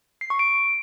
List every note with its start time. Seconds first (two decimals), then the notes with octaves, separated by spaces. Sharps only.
0.21 C7
0.30 C#6
0.39 D7